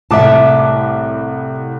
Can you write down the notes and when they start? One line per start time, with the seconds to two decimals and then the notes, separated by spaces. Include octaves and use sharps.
0.11 C2 A2 E5 A5 D6